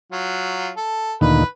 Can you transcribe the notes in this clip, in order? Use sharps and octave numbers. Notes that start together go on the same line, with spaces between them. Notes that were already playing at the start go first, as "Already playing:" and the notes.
F#3 F4
A4
D2 A#2 D#3 B4